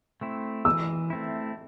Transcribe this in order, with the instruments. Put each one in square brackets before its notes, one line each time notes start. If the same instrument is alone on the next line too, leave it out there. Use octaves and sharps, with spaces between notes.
[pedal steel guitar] A3 C4 E4
[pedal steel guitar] E3 [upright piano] E6
[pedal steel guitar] A3 C4 E4